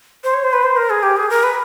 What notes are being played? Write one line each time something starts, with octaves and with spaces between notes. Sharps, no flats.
C5
C#5
C5
B4
C5
A#4
G#4
G4
G#4
A#4
B4